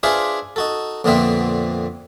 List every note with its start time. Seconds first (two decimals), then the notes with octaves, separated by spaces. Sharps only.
0.03 D4 F4 G#4 B4 C5 E5
0.56 D#4 F#4 A4
1.04 F2 A#2 D3 B3 C4 E5